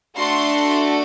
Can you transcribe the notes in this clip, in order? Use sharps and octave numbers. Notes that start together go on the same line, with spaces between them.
A3 D4 F#4 A4 C6